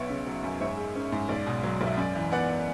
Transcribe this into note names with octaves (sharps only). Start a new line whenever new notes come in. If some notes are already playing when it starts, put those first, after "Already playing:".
Already playing: B1 B3 C#5 E5
C#3
F#3
F#2
G#2 C#5 E5
G#3
C#4
G#2
B1 D5
B2
F#3
B1
E5
F#2 D5
E3
B3 D5 F#5